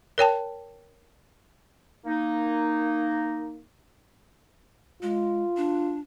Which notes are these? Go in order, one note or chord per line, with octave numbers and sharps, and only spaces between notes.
A#4 C#5 G5 A5
A#3 D#4
G#3 F4
D4